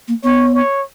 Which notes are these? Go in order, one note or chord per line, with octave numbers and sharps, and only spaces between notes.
A#3
B3 C#5
C#5